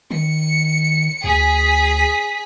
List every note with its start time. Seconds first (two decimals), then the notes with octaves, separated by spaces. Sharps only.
0.11 D#3 C#7
1.24 D2 G#4 B6